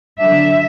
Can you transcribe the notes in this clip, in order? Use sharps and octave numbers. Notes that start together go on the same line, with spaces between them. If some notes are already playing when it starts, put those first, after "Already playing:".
D3 F#3 D4 E5